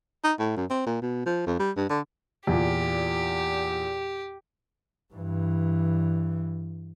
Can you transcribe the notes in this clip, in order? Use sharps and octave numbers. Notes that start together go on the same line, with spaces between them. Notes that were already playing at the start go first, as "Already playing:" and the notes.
D#4
A2
F#2
C4
A#2
B2
F3
F2
G3
G2
D3
E2 A#2 G4
G2 E3